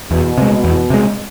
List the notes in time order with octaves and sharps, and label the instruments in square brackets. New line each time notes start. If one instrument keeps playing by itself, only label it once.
[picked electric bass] E2 [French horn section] B2
[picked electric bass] C3 G#3
E2
C3 G#3